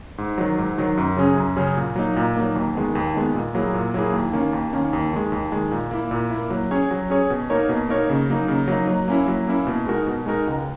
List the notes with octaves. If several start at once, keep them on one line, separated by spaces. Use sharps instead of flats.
G#2
D#3 F#3
G#2
D#3 F#3
F#2
C#3 F#3 C#4 G#4
F#2
C#3 F#3 C#4 G#4
A#2
F#3 A#3 D#4
A#2
F#3 A#3 D#4
D#2
D#3 G#3 B3
D#2
D#3 G#3 B3
A#2
F#3 A#3 E4 G#4
A#2
F#3 A#3 E4 G#4
D#2
D#3 A#3 C#4
D#2
D#3 A#3 C#4
D#2
D#3 G#3
D#2
D#3 G#3
A#2
A#3 E4
A#2
A#3 E4
F#3
C#4 G#4 C#5
F#3
C#4 G#4 C#5
B2
A#3 D#4 A#4 C#5
B2
A#3 D#4 A#4 C#5
C#3
F#3 A#3 D#4
C#3
F#3 A#3 D#4
F#3
A#3 C#4 E4
F#3
A#3 C#4 E4
B2
G#3 D#4 F#4 A#4
B2
G#3 D#4 F#4 A#4
C#2